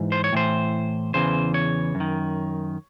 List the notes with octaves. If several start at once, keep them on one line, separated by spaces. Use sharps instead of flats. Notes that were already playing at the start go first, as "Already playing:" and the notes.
Already playing: G#2 E3
C5
C#5
A2 E3 C5
E2 C#3 E3 C5
C#5
F#2
D#3